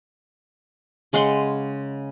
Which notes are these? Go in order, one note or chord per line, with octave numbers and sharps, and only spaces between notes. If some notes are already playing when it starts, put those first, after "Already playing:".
C#3 G#3 F#5 C6